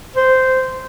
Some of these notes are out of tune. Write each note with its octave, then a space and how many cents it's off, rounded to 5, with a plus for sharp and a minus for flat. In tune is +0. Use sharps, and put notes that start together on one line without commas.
C5 -10